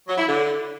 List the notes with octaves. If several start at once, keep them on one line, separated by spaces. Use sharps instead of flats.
F#3
E4
D3